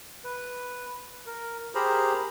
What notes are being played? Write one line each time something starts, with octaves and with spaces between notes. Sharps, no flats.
B4
A#4
G4 G#4 A#4 C5 A#5 B5